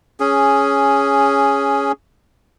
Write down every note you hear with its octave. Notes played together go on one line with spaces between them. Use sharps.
C#4 G#4